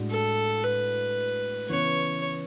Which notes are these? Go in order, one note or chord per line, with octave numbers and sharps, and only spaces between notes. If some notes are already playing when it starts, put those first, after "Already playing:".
Already playing: A2 G#3 D4 F#4
A4
B4
C#3 E3 B3 C#5